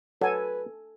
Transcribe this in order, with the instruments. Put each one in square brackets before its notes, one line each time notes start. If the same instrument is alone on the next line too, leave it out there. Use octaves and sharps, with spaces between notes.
[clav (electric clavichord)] F#3 [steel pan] A4 G#5 [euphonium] B4